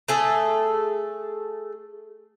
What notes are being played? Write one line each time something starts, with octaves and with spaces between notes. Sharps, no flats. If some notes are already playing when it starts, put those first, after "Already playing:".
A3 G#4 A4